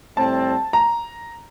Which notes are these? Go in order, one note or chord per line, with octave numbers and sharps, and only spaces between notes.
A2 G3 C4 A5
A#5